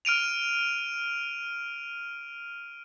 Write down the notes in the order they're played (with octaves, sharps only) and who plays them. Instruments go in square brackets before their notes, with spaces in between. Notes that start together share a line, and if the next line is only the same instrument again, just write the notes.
[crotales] F6 D7 D#7 F7